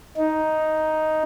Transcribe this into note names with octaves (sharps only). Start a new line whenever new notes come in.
D#4